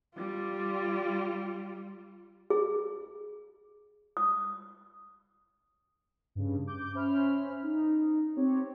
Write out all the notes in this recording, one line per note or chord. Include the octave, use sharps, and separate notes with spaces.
G3 F4
G#4
D#6
G2 C#3
D6 G6
C#4 C5 E5 B5 F6
D#4
C4 G4 C#5